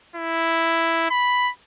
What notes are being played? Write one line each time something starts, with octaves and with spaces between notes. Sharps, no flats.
E4
B5